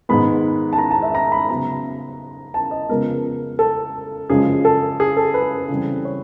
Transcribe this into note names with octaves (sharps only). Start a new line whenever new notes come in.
G#2 D#3 G#3 B3 B5
A5
A#5
A5
E5
A#5
B5
C#3 F#3 B3 A#5
A5
D#5
C#3 F3 G#3 B3 A#4
A4
F#2 C#3 F3 G#3 G#4
A4
G#4
A4
B4
C#3 E3 G3 C4
C#5